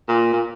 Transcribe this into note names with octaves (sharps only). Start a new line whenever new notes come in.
A#2
A#2